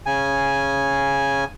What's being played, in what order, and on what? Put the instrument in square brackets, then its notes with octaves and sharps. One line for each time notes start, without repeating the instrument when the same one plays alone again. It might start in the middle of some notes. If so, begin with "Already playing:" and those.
[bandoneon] C#3 G#5